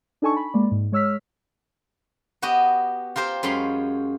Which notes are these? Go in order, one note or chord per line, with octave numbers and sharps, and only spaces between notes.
D4 D#4 A4 G#5 A5 C#6
B5
G#3 A#3 D5
G#2
G#3 C#5 E6 F6 B6
B3 F#4 G4 D#5
F4 G4 A#4 C5
F#2 G#3 C#4 F4 B5 C6